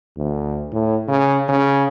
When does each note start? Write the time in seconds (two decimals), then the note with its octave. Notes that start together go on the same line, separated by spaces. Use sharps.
0.17 D2
0.73 A2
1.08 C#3
1.49 C#3